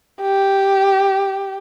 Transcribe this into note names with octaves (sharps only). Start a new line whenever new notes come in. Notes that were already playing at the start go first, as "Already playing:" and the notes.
G4